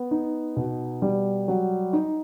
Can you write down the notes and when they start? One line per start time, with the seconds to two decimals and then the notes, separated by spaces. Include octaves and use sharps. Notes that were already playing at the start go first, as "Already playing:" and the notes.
Already playing: B3
0.11 D#4
0.56 B2
1.02 G3
1.48 F#3
1.93 D#4